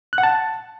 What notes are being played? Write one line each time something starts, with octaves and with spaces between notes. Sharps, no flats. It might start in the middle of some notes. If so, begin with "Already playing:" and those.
F#6
F#5
A5